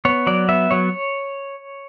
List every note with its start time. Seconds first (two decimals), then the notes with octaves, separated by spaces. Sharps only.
0.05 B3 C#5
0.27 F#3 D5
0.49 B3 E5
0.71 F#3 C#5